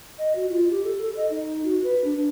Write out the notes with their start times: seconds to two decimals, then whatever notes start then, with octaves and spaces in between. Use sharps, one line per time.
0.18 D#5
0.36 F#4
0.49 F4
0.71 G4
0.85 A4
1.02 A4
1.17 D#5
1.30 D#4
1.65 F#4
1.84 B4
2.04 D4
2.17 D4